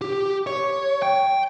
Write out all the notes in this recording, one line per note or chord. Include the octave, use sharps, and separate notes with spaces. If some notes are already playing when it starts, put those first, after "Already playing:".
G4
C#5
G5